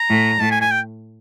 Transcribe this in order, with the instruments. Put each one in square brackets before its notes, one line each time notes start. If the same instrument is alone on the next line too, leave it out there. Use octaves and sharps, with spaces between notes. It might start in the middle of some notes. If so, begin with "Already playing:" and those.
Already playing: [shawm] A#5
[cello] A2
[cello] A2 [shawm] A5
[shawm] G#5
G#5
G5